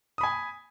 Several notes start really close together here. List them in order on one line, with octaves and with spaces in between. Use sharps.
D#6 B5 G#5